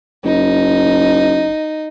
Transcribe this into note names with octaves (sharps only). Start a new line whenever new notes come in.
F#1 D#4